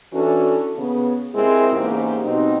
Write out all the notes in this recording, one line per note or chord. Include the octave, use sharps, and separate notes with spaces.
E3 C#4 D4 F#4 A4
C#3 B3
G#3 C4 E4 G4 G#4 A#4
E2 G#2 C#3 A#3 G4
B2 F#3 C4 D#4